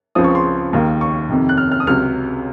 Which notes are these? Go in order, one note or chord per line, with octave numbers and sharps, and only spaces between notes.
C#2 C#3 F3 C4 D#6
C#6
C6
D#2 D#3 A#3
C#6
F2 C3 D#3
F#6
F6
F6
D#6
C#2 C3 F#3 F6